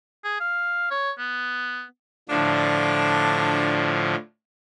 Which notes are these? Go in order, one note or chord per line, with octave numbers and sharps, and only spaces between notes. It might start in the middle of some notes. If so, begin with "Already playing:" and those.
G#4
F5
C#5
B3
A2 D3 F3 D4